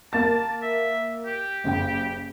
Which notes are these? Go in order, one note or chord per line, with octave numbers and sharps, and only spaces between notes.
A#3 A5 A6
E5
G4
F#1 C#3 G5